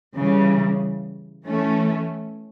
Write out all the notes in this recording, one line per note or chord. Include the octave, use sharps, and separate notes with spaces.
C#3 E3 G3
E3 A3 C#4